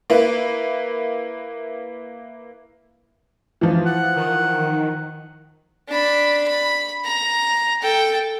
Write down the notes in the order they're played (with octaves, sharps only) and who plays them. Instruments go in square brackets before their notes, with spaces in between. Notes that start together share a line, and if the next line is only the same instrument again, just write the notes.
[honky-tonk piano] A#3 E4 B4
E3 F3
[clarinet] F#5
[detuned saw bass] D#3
[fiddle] D4 B5
B5
A#5
A4 G5